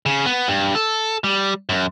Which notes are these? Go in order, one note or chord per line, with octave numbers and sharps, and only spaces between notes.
C#3
B3
G2
A4
G3
F#2